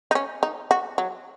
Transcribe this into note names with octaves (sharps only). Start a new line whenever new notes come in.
D#4
C#4
D#4
F#4
F#3